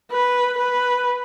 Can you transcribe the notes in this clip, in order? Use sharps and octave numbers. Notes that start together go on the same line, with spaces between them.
B4
B4